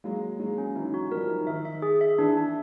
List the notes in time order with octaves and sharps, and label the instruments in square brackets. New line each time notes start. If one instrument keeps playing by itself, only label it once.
[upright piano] F#3 G#3 [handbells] A#3
[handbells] A#3
[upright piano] F#3 G#3 [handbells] A#3
[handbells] C#4
[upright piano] E3 F#3 [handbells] D#4
[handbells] F#4
[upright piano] F3 G3 [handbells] A#4
[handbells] D#4
[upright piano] D#3 [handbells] E5
[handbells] E5
G#4
E5
[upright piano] E3 [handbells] D4
[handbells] D4